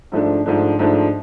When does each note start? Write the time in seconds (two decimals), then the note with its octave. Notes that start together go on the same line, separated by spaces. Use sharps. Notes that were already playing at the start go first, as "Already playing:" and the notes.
0.12 G#2 F3 A3 D4
0.46 G#2 F3 A3 D4
0.79 G#2 F3 A3 D4